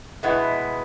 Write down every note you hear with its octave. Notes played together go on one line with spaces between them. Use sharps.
B2 G#3 B3 E4